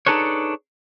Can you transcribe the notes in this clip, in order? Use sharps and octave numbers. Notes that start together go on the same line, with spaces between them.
D4 D#4 G#4 A4 B4 C#5